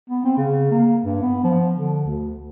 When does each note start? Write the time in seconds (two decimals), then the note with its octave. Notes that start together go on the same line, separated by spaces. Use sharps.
0.10 B3
0.25 C4
0.37 C#3
0.71 A#3
1.03 G2
1.23 B3
1.44 F3
1.76 D3
2.06 D2